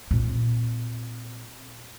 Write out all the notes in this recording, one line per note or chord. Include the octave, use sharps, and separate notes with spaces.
A#2 C4